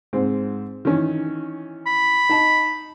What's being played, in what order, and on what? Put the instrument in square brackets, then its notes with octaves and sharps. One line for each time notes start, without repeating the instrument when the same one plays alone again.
[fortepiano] G#2 C4
D#3 E3 C#4
[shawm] B5
[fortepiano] D#4 A5